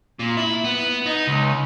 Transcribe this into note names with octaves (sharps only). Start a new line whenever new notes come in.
A#2
E4
B3
D#4
C#2